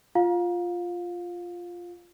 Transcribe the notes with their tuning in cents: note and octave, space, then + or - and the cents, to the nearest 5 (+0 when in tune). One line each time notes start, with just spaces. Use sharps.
F4 +0 F5 +25